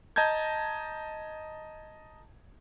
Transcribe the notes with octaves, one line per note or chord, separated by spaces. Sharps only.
D#5 A5 A#5 G6 G#6